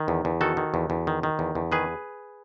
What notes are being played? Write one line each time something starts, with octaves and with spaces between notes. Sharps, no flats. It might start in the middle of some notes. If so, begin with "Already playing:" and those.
Already playing: D#3
E2
E2
D#3 F#4 A4
D#3
E2
E2
D#3
D#3
E2
E2
D#3 G#4 B4